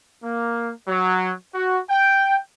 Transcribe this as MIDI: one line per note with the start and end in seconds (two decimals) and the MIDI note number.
0.24 0.70 58
0.88 1.32 54
1.55 1.78 66
1.90 2.39 79